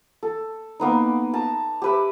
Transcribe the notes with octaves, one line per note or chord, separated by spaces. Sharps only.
A4
A#3 B3 D#4
A5 A#5
G4 B4 E5